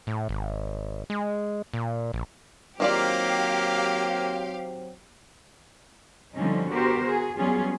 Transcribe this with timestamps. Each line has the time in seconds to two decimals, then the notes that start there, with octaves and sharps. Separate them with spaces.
0.07 A2
0.29 G#1
1.10 G#3
1.74 A#2
2.14 A#1
2.80 D#3 F#3 A#3 C4 F4 G4 D5 F5
6.34 D3 F3 G3 C4 C#4 D#4
6.70 B3 F#4 G4 A#4 C5
7.05 F#4 G#4
7.37 F#3 G3 B3 C#4 F4 G#4